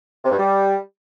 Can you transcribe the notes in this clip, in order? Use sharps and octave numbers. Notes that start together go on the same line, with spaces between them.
C3
G2
G3